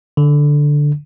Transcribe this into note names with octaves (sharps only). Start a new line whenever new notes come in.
D3